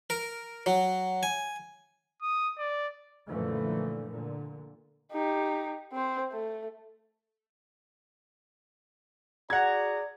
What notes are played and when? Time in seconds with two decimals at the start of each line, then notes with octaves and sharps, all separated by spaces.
0.10 A#4
0.66 F#3
1.23 G#5
2.22 D#6
2.59 D5
3.28 F#2 A#2 D3 E3 F3 A3
4.09 A#2 D3
5.12 D#4 G4
5.93 C4 C5
6.32 A3
9.50 F#4 G#4 D5 F#5 A#5 G#6